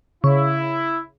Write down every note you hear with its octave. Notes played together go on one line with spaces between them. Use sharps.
C#3 E4